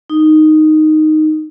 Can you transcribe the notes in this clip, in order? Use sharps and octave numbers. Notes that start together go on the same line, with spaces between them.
D#4